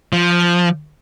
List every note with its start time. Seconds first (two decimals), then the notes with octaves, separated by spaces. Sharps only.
0.13 F3